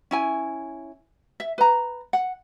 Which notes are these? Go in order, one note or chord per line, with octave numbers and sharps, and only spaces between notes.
C#4 E4 G#5
E5
B4 A#5
F#5